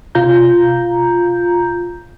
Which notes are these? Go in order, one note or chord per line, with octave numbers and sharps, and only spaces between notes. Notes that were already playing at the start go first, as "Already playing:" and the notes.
C3 F4 A#5 G6